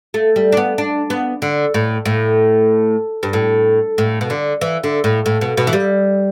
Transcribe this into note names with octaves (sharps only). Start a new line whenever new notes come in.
A3
G3
D4
B3
D4
B3
D3
A2
A2
G2
A2
A2
B2
D3
E3
D3
A2
A2
B2
B2
E3
G3